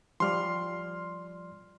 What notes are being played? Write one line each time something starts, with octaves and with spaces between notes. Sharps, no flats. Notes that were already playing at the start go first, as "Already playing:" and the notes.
F3 G3 D5 C6 F6